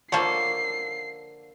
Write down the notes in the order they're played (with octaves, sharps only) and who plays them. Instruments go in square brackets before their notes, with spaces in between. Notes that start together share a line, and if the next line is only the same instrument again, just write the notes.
[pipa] D3 F3 A4 [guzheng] A#3 C#5 [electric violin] C7